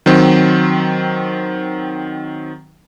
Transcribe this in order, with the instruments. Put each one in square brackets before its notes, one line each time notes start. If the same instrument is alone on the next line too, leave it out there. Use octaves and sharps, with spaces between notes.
[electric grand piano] D#3 F#3 C4